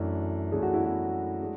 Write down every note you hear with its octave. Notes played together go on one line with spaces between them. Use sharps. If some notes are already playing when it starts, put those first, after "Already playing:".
Already playing: F#2 E3 A3 D4 E4
F#2 E3 A3 D4 G#4
F#4
E4
F#4
G#3 D4